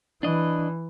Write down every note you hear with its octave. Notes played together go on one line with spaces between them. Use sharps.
E3 D4 D#5